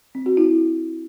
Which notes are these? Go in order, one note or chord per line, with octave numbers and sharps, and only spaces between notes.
C4
F#4
E4